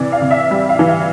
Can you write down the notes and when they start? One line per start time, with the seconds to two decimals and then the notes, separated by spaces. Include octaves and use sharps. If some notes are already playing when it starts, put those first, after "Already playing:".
Already playing: C3 E3 D5
0.12 F5
0.21 C3
0.31 E5
0.51 G3
0.69 F5
0.79 E3
0.89 F5